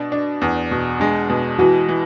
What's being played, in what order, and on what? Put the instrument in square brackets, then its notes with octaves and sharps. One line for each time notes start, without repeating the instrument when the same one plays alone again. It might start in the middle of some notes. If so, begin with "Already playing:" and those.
Already playing: [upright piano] B2 D4
D4
E2
B2
[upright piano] G#3 [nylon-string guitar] D4
[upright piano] B2
[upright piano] E3 [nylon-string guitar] F#4
[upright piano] E3